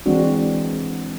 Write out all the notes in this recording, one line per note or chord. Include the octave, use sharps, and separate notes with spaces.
E3 G#3 C4 D4 F#4